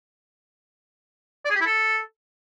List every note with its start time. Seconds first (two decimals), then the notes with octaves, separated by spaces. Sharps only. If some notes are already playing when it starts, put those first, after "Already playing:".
1.45 D5
1.50 G#4
1.56 G4
1.61 E4
1.66 A4